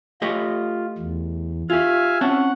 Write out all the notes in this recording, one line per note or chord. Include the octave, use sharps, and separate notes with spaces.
A3 F4 G4 D#5
E2
F4 G4 E5 F5 G#5
C4 C#4 F#5 A5